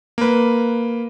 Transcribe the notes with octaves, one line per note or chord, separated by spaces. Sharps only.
A#3 B4